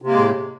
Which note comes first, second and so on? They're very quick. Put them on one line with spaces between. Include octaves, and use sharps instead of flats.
C3 A#3 G#3 A2